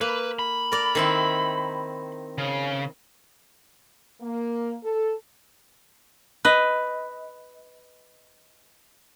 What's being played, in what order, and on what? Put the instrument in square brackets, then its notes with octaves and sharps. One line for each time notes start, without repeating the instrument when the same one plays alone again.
[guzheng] A#3 [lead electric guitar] B4
[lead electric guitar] B5
[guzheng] A#4 D5
D#3 C4 E4
[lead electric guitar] C#3
[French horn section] A#3
A4
[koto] B4 D#5